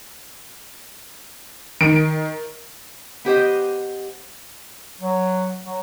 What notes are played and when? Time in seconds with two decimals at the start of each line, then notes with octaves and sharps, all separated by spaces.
1.81 D#3 D7
3.25 B3 G4 C5 D#5
5.01 F#3
5.64 F#3